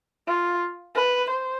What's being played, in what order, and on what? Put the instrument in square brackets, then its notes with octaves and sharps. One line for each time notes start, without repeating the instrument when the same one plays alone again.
[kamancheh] F4
B4
C5